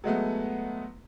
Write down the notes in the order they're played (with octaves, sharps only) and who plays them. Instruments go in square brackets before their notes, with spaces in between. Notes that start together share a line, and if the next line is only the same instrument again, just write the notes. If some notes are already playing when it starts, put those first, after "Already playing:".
[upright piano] F#3 G#3 A3 B3